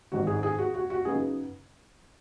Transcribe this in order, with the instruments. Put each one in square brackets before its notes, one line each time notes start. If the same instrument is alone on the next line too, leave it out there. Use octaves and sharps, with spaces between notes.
[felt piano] G#1 G#2 D#3 F#4
G#4
G#4
F#4
F#4
F#4
C#3 F#3 B3 D#4 G#4